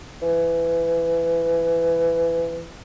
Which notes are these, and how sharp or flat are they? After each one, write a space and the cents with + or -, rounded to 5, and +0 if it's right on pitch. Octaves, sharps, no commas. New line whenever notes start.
E3 +20